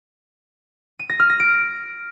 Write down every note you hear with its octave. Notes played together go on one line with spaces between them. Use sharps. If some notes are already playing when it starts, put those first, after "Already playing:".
D#7
A#6
F6
A#6
D7